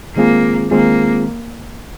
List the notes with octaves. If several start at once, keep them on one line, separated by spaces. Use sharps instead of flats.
D#3 G#3 A#3 C4 F4 G#4
D#3 G#3 A#3 C4 F4 G#4